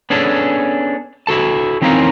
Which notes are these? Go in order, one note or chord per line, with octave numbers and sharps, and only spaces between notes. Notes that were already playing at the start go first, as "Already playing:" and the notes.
B3 C#4 D4 G#4 A4
E4 F#4 A4 A5
E3 C4 C#4 D#4 F4 A#4